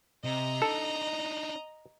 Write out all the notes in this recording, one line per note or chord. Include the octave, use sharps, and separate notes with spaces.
C3 D#5 A#5
D4 D#4 A4